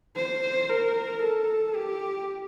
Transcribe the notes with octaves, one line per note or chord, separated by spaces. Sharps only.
C5
A#4
A4
G4